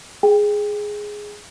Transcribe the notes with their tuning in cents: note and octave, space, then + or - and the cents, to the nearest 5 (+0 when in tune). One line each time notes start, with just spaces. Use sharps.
G#4 +0 G5 +20